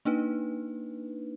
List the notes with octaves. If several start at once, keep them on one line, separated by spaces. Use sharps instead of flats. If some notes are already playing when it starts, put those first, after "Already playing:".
A#3 D4 D#4 B4